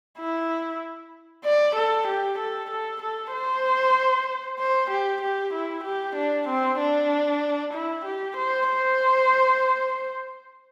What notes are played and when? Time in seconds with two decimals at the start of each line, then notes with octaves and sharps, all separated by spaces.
0.19 E4
1.45 D5
1.75 A4
2.07 G4
2.38 A4
2.71 A4
3.02 A4
3.33 C5
4.59 C5
4.91 G4
5.21 G4
5.54 E4
5.84 G4
6.16 D4
6.48 C4
6.79 D4
7.74 E4
8.05 G4
8.37 C5
8.69 C5